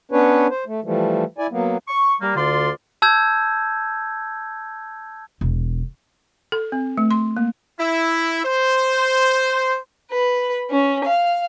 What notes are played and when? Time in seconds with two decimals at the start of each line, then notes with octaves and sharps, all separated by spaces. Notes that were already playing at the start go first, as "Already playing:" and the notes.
0.12 B3 C#4 D4 B4 C#5
0.50 C5
0.66 A3
0.84 E3 F3 G3 A3
1.38 E4 D5 G#5
1.51 F#3 A#3 B3
1.88 C#6
2.21 G3 A#3
2.36 D2 D3 F4 D5 C6
3.02 A5 E6 G6 G#6
5.41 E1
6.52 A4
6.72 C4
6.98 A3
7.11 C6
7.37 A#3
7.79 E4
8.45 C5
10.12 B4
10.70 C#4
11.06 F5